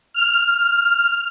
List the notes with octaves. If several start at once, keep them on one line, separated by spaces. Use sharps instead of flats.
F6